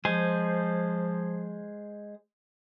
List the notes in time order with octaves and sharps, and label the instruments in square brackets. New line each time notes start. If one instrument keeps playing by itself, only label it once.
[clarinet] F3 [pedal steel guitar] G#3 C5 G#5